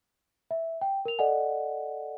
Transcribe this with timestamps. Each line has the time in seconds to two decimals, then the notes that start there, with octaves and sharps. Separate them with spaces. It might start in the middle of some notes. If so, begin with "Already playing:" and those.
0.51 E5
0.81 G5
1.05 A#4 F7
1.19 A4 D5 D#5 F#5 G#5